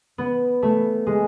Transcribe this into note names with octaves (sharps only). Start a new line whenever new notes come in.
B3
A3
G#3